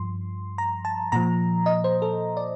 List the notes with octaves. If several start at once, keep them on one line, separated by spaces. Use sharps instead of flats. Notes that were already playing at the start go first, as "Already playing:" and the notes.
Already playing: G2 F3 C6
A#5
A5
A#2 F3 A#5
D#5
C5
A4
D5